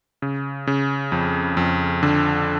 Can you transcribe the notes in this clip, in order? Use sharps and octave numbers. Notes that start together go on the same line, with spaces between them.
C#3
C#3
F2
F2
D3